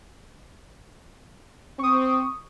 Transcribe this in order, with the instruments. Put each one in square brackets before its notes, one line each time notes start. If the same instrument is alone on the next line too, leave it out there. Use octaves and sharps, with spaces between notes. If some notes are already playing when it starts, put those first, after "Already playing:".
[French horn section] C4 [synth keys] C#6 D#6